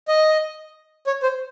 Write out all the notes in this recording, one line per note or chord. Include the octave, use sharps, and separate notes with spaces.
D#5
C#5
C5